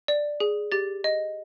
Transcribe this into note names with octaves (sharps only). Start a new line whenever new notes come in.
D5
G#4
G4 A6
D#5